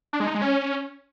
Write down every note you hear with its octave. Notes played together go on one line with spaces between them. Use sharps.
D4
G#3
D#4
G#3
C#4